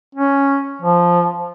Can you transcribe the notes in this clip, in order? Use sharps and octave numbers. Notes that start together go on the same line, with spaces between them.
C#4
F3